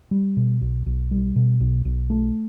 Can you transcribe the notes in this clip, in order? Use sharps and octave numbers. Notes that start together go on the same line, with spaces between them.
G3
B2
B1
B1
G3
B2
B1
B1
A3